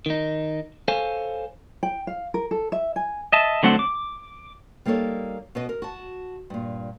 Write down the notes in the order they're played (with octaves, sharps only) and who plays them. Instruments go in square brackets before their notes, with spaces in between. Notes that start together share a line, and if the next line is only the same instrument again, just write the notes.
[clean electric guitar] D#3 D#4
A4 C5 C#5 F5 G#5
[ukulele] G5
F5
A#4
A4
E5
G#5
[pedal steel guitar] D#5 E5 A5
D3 F#3 A3 C4 F#5
D6
[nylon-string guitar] G3 A#3 D#4 A4 C#5
B2 B4 D#5
A#4
F#4 A5
G2 A#2